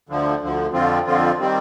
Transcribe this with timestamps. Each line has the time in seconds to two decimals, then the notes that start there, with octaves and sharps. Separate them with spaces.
0.09 D2 D3 F3
0.42 D2 D3 F3
0.73 F2 D3 F3 C4 F4
1.06 F2 D3 F3 C4 F4
1.39 D#3 G3 C4